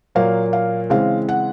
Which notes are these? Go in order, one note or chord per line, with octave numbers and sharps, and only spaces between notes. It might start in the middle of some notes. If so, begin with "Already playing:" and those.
A#2 F#3 A#3 F5
F5
C#3 E3 G#3 C4 F5
F#5